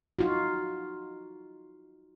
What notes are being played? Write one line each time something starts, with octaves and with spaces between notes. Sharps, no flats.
D#4 F4 F#4